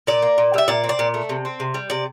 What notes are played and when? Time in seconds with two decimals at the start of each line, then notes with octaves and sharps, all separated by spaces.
0.07 A#2 D5
0.22 A#3
0.38 A#2
0.54 G3 E5
0.68 A#2 D5
0.84 C4
0.89 D5
0.99 A#2
1.14 A3
1.29 C3
1.45 C4
1.60 C3
1.74 G3
1.90 C3 D5